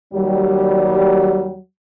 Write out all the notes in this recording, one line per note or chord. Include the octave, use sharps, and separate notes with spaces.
D#2 F#3 G3